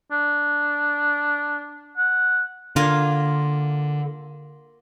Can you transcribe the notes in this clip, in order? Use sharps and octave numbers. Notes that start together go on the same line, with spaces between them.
D4
F#5
D3 A#3 F4 G#5